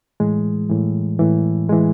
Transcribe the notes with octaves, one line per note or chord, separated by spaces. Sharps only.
A2 E3 G#3
A2 E3
A2 E3
A2 E3 G#3